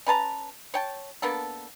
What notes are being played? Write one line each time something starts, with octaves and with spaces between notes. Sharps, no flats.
C#4 B4 A5 A#5
C#5 G5 A5
A#3 B3 D4 A4